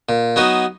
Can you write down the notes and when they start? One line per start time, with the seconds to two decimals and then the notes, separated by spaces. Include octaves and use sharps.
0.09 A#2
0.36 F#3 B3 D#4 F#4